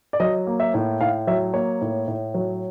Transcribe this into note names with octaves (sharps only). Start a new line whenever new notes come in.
D5
F#3 D#5
A#3
E5
A2
A2 F5
F#3 E5
A#3 C#5
A2
A2
F#3